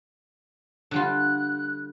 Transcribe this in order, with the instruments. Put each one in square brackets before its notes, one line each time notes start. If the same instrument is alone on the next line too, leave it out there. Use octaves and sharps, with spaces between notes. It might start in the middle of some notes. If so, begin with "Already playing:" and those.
[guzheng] D3 G3 F4 [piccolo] F#6